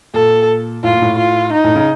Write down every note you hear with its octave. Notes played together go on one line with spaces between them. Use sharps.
A#2 A4
A2 F4
A#2
A2
F4
D#4
A2
C#3